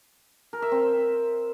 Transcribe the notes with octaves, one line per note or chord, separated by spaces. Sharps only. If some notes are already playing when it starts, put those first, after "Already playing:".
A#4
E5
C4